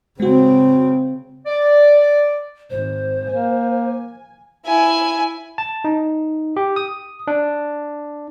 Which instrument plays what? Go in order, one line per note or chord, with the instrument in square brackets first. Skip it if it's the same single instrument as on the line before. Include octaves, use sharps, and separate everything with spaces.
[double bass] C#3 C4 [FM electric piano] G#3 F#4
[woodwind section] D5
[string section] G#1 [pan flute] C5
[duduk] A#3 [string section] G#5
[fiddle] E4 G#5
[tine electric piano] A5
D#4
G4
D#6
D4